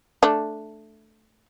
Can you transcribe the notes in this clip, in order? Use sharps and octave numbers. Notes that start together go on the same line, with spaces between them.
A3 D4